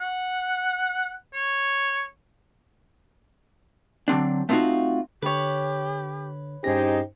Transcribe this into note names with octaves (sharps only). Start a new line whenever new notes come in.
F#5
C#5
D3 F#3 C4 D4
A3 B3 C4 D#4 F4 F#4
D3 G4 B4 C#5
G2 C#4 D#4 G4 G#4 C5 A#6